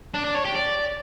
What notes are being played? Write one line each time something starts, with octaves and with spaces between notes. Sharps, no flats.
D4
D4
C#5
G4
D5